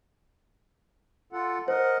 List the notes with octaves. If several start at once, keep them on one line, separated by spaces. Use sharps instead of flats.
F4 A4 F#5
A#4 C5 D#5 F#5